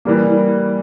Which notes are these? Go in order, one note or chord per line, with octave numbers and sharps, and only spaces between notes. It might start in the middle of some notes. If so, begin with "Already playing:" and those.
E3 G3 A#3